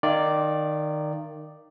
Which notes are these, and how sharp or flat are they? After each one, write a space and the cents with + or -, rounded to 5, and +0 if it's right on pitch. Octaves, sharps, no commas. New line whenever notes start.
D#3 -15 D5 +0 F5 -35